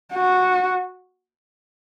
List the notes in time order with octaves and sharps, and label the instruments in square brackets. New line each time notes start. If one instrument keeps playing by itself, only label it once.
[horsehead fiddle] F#4